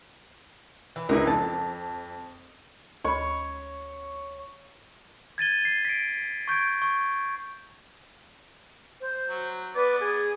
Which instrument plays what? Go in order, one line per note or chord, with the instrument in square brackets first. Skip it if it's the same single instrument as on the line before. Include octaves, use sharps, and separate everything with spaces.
[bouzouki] E3
[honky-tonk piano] C#2 D4 E4 [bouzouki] A#4 B4 G#5
[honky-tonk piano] F2 [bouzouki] A5
[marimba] D2 B5 [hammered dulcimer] C#5
[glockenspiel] G#6 A6 D#7 G7
C7
B6 D7
C#6 G6 G#6 D7
C#6
[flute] C5
[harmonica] F#3
[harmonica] B3 D5 [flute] B4
[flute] G#4